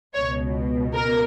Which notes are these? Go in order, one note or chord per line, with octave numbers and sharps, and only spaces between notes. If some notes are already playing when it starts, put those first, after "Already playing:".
C#2 B2 C#5
A#4